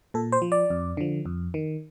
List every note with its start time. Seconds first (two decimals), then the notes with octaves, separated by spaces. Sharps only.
0.14 A#2 A4
0.32 C5
0.42 F3
0.52 D5
0.70 F2
0.97 D3 F3
1.26 F2
1.54 D#3